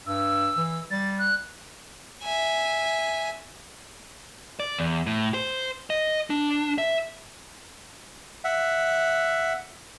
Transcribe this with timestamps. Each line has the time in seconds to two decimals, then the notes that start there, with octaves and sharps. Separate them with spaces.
0.07 G2 E6
0.57 E3
0.91 G3 A6
1.19 F#6
2.23 E5 G#5
4.60 D5
4.79 E2
5.07 A2
5.34 C5
5.90 D#5
6.30 D4
6.78 E5
8.44 E5 F#5